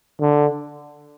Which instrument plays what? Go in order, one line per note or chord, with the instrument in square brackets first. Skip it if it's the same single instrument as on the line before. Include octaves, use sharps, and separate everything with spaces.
[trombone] D3